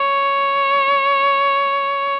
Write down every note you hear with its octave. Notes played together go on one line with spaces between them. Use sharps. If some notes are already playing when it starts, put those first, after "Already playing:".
Already playing: C#5